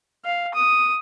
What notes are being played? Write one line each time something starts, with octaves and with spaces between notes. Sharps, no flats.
F5
D#6